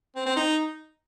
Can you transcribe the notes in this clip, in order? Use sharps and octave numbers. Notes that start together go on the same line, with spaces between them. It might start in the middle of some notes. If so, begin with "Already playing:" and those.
C4
C4
D#4